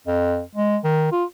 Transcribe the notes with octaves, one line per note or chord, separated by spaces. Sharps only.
F2
G#3
D#3
F4